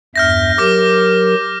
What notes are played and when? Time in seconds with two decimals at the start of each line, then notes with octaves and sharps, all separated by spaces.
0.16 E2 G2 E5 F6 G6 A#6
0.58 F#3 G4 A#4 D6 F6 A#6